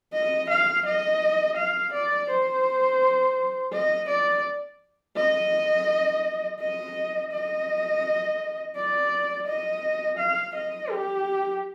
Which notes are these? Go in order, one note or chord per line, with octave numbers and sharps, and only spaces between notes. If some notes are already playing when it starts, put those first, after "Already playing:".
D#5
F5
D#5
F5
D5
C5
D#5
D5
D#5
D#5
D#5
D5
D#5
F5
D#5
G4